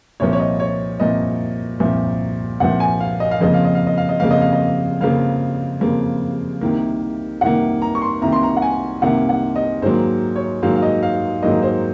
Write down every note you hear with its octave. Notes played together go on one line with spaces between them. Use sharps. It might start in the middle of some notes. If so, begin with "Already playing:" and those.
C2 A#2 F3 C#5
C#5
D#5
C#5
C2 A#2 F3 D#5
C2 A#2 F3
C2 A#2 F3 F#5
G#5
F5
D#5
F5
F2 C#3 F3 A#3 D#5
F5
D#5
F5
D#5
F5
D#5
F2 C#3 F3 A#3 F5
D#5
F5
D#5
F2 C#3 F3 A#3 F5
F2 C#3 F3 A#3
C2 C3 D#3 A#3
C2 C3 D#3 A#3 F#5
A#5
C#6
C6
C2 C3 D#3 A#3 A#5
C6
A#5
F#5
G#5
C2 C3 D#3 A#3 F#5
F#5
D#5
G#2 D#3 F#3 A#3 C5
C#5
G#2 D#3 F#3 A#3 F5
F5
D#5
F5
G#2 D#3 F#3 A#3 D#5
C5